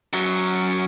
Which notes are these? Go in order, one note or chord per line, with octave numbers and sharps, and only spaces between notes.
F#2 F#3